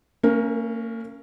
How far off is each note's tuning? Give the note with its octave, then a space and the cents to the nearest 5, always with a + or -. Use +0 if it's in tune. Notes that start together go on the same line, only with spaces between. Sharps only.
A#3 -40 C#4 +0 A#4 +15